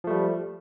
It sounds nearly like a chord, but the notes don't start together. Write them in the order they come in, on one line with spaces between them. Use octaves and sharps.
F3 A3 G3